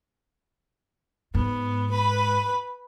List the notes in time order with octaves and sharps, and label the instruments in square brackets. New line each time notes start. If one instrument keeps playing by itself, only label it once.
[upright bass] G#2 [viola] B3
[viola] B4 B5